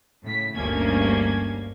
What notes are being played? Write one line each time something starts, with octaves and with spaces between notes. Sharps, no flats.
A2 C#3 B6
G1 D2 G2 A#3 C#4 G#6